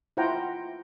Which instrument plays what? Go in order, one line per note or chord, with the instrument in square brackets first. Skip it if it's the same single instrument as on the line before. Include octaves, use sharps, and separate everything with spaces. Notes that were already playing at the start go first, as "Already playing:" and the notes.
[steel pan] E4 F4 C5 F#5 G5 A#5